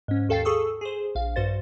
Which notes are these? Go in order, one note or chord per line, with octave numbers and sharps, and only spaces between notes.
G#2 C#4
D#2 A4 F5 G5 A6 C7
G#4 A4 C#6 D#6 E6
G#4 C5
A#1 F5
G2 F#4 C5 A6